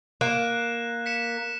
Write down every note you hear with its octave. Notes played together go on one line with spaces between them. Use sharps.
A#3 F#6 E7
B6 C#7 E7